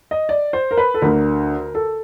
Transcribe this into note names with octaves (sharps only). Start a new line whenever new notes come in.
D#5
D5
C5
A#4
B4
A4
D2 D3 A#4
A4